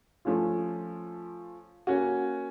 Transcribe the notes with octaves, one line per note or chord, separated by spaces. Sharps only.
F3 A3 C#4 F4
A#3 C#4 F#4